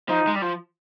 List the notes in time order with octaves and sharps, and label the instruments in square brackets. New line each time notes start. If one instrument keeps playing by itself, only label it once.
[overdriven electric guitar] F3 [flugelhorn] D#4
[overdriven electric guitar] G#3
G3
F3